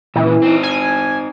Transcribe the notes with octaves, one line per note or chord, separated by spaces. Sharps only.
A#2 C#3 E3
C4 D#4
G#5